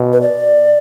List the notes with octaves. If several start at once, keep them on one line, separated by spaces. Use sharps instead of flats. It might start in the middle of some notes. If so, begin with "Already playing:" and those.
Already playing: B2
B4
D5